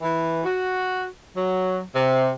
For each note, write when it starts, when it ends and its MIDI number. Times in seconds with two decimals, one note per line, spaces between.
0.01 0.41 52
0.44 1.04 66
1.35 1.80 54
1.94 2.30 48